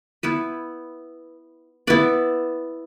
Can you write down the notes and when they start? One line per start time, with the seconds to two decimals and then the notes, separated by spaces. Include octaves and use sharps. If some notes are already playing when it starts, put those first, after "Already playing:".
0.23 B3 E4 B4
1.87 B3 E4 B4 D5